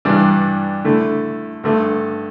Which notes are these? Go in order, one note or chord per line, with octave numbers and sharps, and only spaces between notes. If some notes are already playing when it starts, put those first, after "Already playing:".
G2 E3 G3 D4
D3 A3 E4
G2 D3 A3